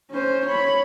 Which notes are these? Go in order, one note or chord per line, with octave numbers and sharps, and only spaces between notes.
C#4 C5
C#5 B5